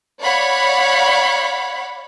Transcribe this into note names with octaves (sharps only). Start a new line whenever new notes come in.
C#5 D5 F5 F#5 B5